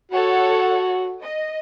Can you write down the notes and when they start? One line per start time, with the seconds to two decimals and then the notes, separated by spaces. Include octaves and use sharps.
0.12 F#4 A4 C#5 F#5
1.22 D#5